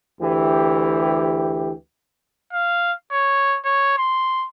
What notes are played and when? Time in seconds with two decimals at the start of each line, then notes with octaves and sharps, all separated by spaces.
0.21 D2 E3 G4
2.53 F5
3.12 C#5
3.65 C#5
3.98 C6